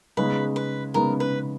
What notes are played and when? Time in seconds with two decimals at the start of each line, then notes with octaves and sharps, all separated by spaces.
0.17 C#3 G#3 B3 D#4 B4
0.56 B4
0.94 C#3 G#3 B3 D#4 A#4
1.20 B4